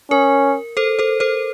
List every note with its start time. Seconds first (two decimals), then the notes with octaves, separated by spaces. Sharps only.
0.11 C#4 A#4
0.77 A4 C5
0.99 A4 C5
1.20 A4 C5